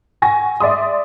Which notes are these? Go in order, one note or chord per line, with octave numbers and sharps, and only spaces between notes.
F#5 G#5 C#6 A#6
D5 E5 C6 D#6